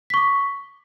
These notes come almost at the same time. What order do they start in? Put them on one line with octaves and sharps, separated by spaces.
B6 C#6 D6